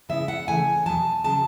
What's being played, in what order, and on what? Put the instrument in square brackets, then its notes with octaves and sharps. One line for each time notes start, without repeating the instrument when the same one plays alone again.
[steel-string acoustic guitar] C#3 G#3 B3 E4 E5
F#5
C#3 E3 A3 G#5
E2 B2 F#3 A5
C#3 F#3 A5